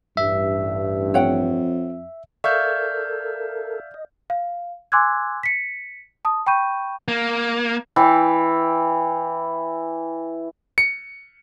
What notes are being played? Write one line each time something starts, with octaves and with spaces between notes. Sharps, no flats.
A1 G2 E5
F2 C#5 F#5 G5
A4 A#4 D5 E5 F5 C#6 F6 G6
D#5
F5
G#5 C6 D6 E6 F#6 G#6
B6 C#7
A5 D#6
G5 B5 C#6 G6 D#7
A#3
E3 G5 D6
C#7